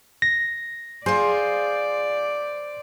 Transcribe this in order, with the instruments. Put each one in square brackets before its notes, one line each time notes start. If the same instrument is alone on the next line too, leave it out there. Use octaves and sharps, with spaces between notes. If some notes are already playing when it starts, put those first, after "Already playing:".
[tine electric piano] A#6
[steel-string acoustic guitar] F4 G#4 [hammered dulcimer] C5 [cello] D5